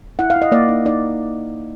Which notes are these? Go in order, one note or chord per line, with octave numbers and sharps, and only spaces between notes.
E4 F#5
F5
E4
D#5
A#3 D5
D#4
D#4 D5